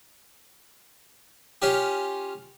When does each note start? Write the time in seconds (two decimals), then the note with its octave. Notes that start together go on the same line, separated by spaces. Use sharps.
1.62 C#4 F4 G4